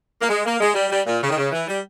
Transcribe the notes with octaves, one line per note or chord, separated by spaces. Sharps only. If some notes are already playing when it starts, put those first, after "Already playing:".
A#3
G#3
A#3
G#3
G3
G3
A#2
C#3
D#3
C#3
E3
G3